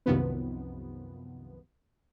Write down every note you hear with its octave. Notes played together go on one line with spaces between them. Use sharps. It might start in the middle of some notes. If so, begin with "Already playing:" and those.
C2 F#2 C3 D#3 F3 B3